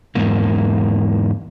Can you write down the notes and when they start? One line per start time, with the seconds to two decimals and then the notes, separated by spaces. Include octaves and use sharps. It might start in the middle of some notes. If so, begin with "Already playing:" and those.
0.15 E2 G#2 A#3